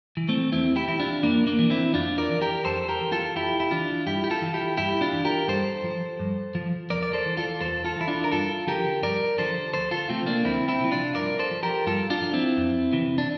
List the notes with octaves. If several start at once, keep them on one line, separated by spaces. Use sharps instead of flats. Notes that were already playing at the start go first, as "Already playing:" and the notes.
E3
A3 C4
E2 C4 E4
E4 G4
E3 E4
D4 F4
F2 A#3 D4
A#3 D4
E3
C4 E4
F2 D4 F4
A#4 D5
E3
G4 A#4
F2 A4 C5
G4 A#4
E3
F4 A4
F2 E4 G4
E4
E3 D4 F4
G2 E4 G4
G4
F4 A4
E3
E4 G4
G2 E4 G4
D4 F4
E3
G4 A#4
G2 A4 C5
F3
G2
F3
E2 A#4 D5
D5
A4 C5
E3
F4 A4
E2 A4 C5
F4 A4
E3 E4
D4 F4
A#4
G2 F4 A4
D3 F3 G4 A#4
G2 A#4 D5
D3 F3 A4 C5
D2 A4 C5
F4 A4
C3 F3 A3 C4
A#3 D4
D2 C4 E4
C4 E4
C3 F3
D4 F4
G2 A#4 D5
A4 C5
F3
G4 A#4
G2 F4 A4
D4 F4
F3
C4 E4
F2
C3 E3
D4